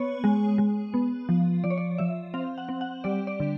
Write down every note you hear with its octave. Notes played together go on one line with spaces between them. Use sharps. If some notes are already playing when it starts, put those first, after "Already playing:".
Already playing: B3 C#5
G#3
G#3
B3
F3
F3 D5
C#5
D5
F3 E5
C4 F5
F#5
C4
F#5
G3 D5
D5
D3